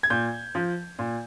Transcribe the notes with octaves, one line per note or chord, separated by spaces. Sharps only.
G#6
A#2 G6
F3
A#2